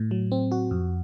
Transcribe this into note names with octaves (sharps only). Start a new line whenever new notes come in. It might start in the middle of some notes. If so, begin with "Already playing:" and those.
Already playing: A2
F#3
C4
F#4
F2